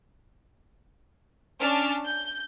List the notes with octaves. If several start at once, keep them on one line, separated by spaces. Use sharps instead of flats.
C#4 D4 A5 F6
G6